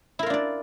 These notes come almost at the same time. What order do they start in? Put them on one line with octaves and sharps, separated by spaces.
E4 A#4 F4 D4 D5